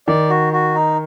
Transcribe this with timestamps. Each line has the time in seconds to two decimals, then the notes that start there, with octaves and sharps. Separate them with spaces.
0.08 D#3 D5
0.30 F#4
0.53 F#4
0.74 D#4